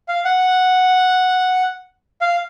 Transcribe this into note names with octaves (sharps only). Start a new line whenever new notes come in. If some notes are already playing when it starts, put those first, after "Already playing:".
F5
F#5
F5